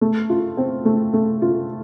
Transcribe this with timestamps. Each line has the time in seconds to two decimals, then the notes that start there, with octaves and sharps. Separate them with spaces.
0.01 A3
0.30 F4
0.57 C4
0.85 A3
1.14 A3
1.42 F4